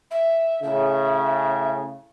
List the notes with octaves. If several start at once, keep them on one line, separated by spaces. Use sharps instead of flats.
E5
A2 C#3 E5